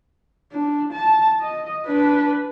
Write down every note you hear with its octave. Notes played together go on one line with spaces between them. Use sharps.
D4
A5
D#5
D4 B4